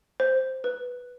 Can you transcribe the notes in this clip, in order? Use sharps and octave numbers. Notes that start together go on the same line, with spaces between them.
C5
B4